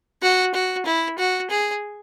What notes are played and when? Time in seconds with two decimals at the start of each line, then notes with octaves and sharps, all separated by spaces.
0.22 F#4
0.54 F#4
0.86 E4
1.18 F#4
1.50 G#4